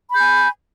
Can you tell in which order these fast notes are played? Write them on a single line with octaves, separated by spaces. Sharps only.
B5 G6 G#5